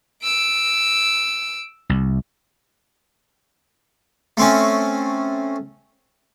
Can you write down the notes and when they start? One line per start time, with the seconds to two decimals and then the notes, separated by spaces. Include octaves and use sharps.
0.23 E6 D7
1.89 C2
4.37 A3 C4 C#4